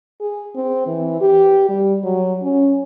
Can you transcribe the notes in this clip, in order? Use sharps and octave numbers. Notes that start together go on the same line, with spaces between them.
G#4
C4
E3
G4
G3
F#3
C#4